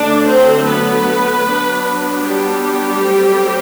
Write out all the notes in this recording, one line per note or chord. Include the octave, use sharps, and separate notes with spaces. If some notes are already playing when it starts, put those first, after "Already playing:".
Already playing: D3 F#3 A3 D4 D5
C4 C5
B3 B4
F#3 B3 D4
G3 G4
F#3 A3 C4